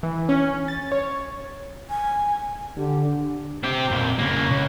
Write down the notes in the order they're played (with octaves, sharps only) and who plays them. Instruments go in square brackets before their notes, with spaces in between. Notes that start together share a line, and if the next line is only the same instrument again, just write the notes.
[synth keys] E3
C#4
A6
C#5
[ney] G#5
[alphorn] D3 [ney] G4
[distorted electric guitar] C4 G4
F2 A#2
C#3 A#3
C#2